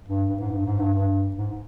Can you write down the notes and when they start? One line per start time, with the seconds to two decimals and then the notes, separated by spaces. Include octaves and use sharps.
0.08 G2
0.29 G2
0.40 G#2
0.51 G2
0.66 G#2
0.79 G2
0.93 G2
1.36 G#2